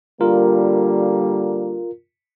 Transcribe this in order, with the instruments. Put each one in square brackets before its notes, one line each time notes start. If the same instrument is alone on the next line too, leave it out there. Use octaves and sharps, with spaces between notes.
[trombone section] D3 G3 A#3 [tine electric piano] F4 A#4